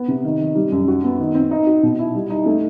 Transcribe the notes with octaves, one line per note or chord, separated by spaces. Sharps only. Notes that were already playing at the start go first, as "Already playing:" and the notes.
Already playing: B3
C3
D#3
D#3
G3
F#2
F#4
B3
D#3
C4
D#4
F#4
B2
E4
G3
D#4
A3